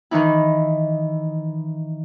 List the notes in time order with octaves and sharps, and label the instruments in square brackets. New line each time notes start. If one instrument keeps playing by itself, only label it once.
[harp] D#3 E3 D#4 E4